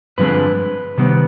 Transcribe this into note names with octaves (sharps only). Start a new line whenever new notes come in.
G2 D3 F3 G#3 C4 B4
C3 D#3 G3 B3